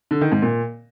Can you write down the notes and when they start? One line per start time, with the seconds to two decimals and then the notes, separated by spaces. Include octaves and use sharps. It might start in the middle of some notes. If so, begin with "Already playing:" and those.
0.11 D3
0.21 D#3
0.32 G#2
0.42 A#2